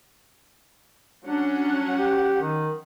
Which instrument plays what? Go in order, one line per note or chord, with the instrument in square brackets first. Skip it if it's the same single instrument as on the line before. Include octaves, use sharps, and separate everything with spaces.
[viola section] F#3 C#4 F#5 [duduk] D4
[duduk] G4
D#3